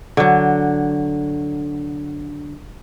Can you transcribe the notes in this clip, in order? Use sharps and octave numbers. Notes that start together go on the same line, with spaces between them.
D3 F#3